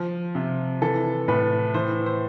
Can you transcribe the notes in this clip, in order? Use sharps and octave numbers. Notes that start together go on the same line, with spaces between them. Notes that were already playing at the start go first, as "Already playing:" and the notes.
Already playing: F3
C3
E3 A4
A2 B4
E3 C5
C5